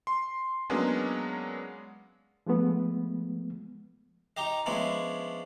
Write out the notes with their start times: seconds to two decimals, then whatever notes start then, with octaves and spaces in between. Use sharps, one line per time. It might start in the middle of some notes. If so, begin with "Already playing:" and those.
0.07 C6
0.70 F#3 G#3 A#3 B3 C#4 D4
2.47 F3 G#3 A3 B3
4.37 D#4 G4 D#5
4.66 F3 G#3 B3 C#4 D4 E4